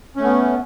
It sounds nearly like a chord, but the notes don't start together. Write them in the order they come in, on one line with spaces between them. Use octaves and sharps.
C#4 A3 B3